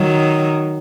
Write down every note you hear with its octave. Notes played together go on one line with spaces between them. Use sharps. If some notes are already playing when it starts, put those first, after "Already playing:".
Already playing: D#3 F#3